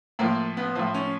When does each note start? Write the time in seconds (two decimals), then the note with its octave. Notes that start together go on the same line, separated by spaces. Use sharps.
0.19 A2 F3 A#3
0.57 B3
0.76 A2 F3
0.94 C#4